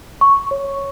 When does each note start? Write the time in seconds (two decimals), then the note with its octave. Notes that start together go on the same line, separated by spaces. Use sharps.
0.21 C#6
0.51 C#5